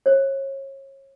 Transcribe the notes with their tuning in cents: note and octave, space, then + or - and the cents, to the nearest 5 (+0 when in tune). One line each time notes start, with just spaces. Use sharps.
C#5 -30